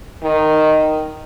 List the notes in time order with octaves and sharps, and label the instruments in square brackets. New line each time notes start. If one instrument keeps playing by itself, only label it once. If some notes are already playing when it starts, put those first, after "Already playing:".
[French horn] D#3